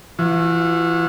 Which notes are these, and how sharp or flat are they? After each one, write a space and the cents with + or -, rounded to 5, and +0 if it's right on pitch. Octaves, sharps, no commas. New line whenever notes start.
E3 +30 F#4 -40